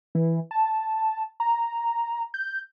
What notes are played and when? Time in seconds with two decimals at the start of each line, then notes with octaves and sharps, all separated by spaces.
0.15 E3
0.51 A5
1.40 A#5
2.34 G6